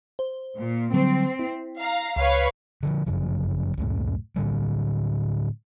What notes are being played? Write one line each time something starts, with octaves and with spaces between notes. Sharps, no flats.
C5
A#2
D3 F#3 G3 C4
E4
F5 A#5
C#2 B4 C#5 F5
D3 E3 F3
G1 F#2 C#3 F3
C#2 F#2 A2
A2 D3 G3